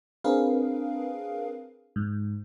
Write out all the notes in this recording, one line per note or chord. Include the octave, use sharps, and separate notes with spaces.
C4 D4 G#4 A#4 B4 F5
G#2